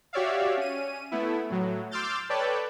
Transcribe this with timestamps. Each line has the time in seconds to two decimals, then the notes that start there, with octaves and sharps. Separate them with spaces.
0.13 F#4 G4 C#5 D5 E5 F5
0.57 C#4 D#7
1.11 A3 B3 E4
1.50 A2 F#3
1.91 C6 D6 E6 F6 G6 A6
2.29 A4 B4 C#5 D5 G5 A5